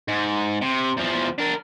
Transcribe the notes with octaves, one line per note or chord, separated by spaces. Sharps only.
G#2
C3
E2 F3
D4 A#4